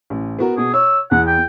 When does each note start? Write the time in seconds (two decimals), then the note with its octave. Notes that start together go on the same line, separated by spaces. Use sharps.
0.10 A1
0.39 B3 F#4 A#4
0.57 B2 F#4 G#4
0.74 C#5 E6
1.11 E2 F#5
1.27 G5